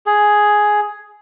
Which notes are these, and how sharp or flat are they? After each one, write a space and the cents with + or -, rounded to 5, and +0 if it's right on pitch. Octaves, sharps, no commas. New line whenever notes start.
G#4 +5